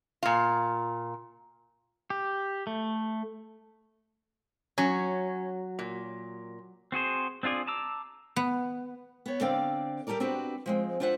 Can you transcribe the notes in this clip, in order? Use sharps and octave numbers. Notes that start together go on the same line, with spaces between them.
A#2 F4
G4
A3
F#3 C#4
A#2
C4 F#4 G#4 C5
C4 D4 F4 G#4 D5
A5 A#5 D6 E6
B3
B3 C#5
D3 C4 D5 F5 G5
G3 G4 A4 A#4 D5
C4 D4 F#4 G4 B4
F3 G#3 C4
D4 F4 C5 E5 F#5